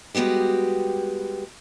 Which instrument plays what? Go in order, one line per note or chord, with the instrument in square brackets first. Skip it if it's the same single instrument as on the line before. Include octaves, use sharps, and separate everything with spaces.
[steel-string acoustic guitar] G3 G#3 B3 F#4 G4